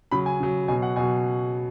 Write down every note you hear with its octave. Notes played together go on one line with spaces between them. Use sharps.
C#3 F#3 B5
G#5
C#3 F#3
B2 F#3 G#5
F#5
B2 F#3 G#5